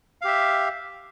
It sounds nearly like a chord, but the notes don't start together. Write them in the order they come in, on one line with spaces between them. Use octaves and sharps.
F5 G4 E5